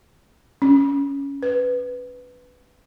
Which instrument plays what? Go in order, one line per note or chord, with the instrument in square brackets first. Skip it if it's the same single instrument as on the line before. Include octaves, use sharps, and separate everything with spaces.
[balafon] C#4
B4